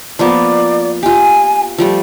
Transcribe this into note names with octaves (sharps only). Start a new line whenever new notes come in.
F3 A#3 B3 D5
F4 G4 G#5
F3 G3 A3